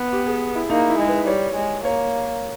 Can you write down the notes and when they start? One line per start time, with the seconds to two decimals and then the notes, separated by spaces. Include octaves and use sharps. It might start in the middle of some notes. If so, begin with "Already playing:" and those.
Already playing: B3
0.12 G4
0.27 G#4
0.55 E4
0.70 A#3 D#4
0.89 E4
0.99 G#3
1.08 B4
1.27 G3 C#5
1.56 G#3
1.84 A#3 C#5